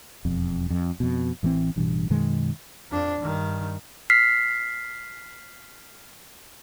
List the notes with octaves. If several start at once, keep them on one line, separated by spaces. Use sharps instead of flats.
E1 F2
F2
F2 B2
A1 E3 F3 C4
A1 G2 B2 E3
F#2 B2 D#3 G#3
F2 D4
G2 D#3
F6 B6 C7